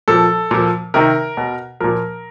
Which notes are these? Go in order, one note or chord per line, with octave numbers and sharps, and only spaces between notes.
A#2 F3 A4
A#2 F3
C3 D#3 A#4
B2
A#2 F3 A#4